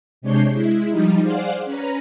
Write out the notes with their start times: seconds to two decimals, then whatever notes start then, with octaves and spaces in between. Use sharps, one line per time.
0.22 C3 G#3 D4 C#5 G6 C7
0.53 G#3 E4
0.90 F3 G3 D#4
1.22 G#4 C5 D5 F5 F#5
1.65 C#4 B4 A#5